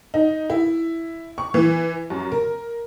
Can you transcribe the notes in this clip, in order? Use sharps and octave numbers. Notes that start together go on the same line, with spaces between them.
D#4
E4
C#6
E3
F#2
A#4